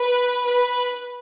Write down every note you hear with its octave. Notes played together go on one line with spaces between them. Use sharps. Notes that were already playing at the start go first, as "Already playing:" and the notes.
Already playing: B4
B4